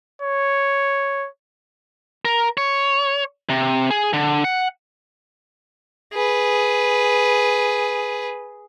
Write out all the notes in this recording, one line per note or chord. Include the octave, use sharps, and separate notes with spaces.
C#5
A#4
C#5
C3
G#4
D3
F#5
G#4 B4